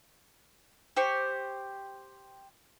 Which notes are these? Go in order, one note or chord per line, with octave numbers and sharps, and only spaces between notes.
G4 C5 C#6